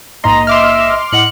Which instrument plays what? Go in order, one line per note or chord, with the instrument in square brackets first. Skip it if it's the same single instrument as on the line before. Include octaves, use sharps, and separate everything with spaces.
[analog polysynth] A#1 G#2 A#3 [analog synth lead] D#5 [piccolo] A#5 [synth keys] C6
[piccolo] E5 [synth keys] C6 D6 F6
[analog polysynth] A2 D#5 F#5 [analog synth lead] C#7 [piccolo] F#7